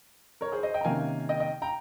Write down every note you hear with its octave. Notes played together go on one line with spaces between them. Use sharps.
A#4 C#5
G#4 C5
C5 D#5
D#5 G5
A#5
C3 D#3 A#3 C#4 F5 G#5
D#5 G5
D#5 G5
G5 A#5